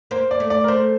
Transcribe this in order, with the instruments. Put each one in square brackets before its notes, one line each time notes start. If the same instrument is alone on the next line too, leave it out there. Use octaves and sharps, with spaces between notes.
[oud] A#3 [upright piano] C5
[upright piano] D5
[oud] A3
[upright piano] D5
A#4
[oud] A3 [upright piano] C5